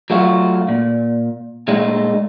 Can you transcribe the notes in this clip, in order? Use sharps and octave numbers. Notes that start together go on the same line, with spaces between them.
F#3 A3 F4 F#4
A#2
A#2 G#3 A3 D#4